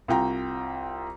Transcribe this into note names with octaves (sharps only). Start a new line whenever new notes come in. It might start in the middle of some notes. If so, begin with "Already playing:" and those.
C2 F4 G5 A#5